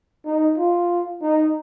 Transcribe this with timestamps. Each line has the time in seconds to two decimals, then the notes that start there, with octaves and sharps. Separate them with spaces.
0.26 D#4
0.58 F4
1.22 D#4